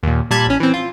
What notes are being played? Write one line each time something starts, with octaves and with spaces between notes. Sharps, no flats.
D#2 A#2
A#2 G3 A5 B5 G#6
A1 C#4
E3 C4
F4